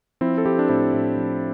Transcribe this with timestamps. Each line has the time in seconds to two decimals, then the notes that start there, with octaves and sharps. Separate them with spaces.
0.21 F3 C4 E4
0.38 A4
0.45 F3 E4 G4
0.59 D4
0.69 A2 C4 E4
0.93 A2
1.17 F3